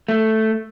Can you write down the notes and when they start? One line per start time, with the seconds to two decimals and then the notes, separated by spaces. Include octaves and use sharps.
0.09 A3